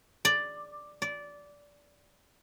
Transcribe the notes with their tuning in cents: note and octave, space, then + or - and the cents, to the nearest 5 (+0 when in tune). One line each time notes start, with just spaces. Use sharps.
D5 +5
D5 -15